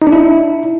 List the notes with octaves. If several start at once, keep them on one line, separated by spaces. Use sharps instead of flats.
D#4
D4
E4